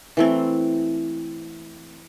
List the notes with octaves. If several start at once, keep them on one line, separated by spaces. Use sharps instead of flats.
E3 A3 C4